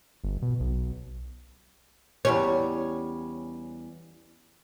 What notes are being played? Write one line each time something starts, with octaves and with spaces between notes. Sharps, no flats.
G1
B2
B1
E2 G3 C#4